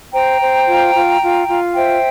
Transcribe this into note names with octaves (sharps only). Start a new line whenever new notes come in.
C5 G5 A#5
C5
F4
F4
F4
F4
C5 E5 G5